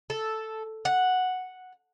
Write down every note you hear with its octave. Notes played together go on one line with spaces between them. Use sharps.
A4
F#5